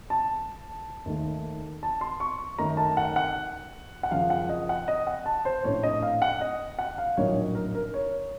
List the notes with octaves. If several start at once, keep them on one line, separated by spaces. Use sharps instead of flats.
A5
D#2 D#3 A3
A5
C6
C#6
F#2 D#3 A3 C#4 A#5
A5
F#5
F#5
F#5
F#2 C#3 F3 F5
F#5
D#5
F#5
D#5
F#5
A5
C5
A#1 A2 A3 C#4 C#5
D#5
F5
F#5
D#5
F#5
F5
A#1 A2 F#3 A#3 D#4 C#5
A#4
A#4
C#5